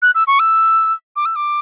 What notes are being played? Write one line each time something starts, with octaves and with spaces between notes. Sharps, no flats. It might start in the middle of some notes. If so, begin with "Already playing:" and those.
F#6
E6
C#6
E6
D6
E6
D6